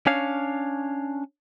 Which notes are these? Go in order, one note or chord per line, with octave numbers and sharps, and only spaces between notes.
C#4 D4 C#5 F5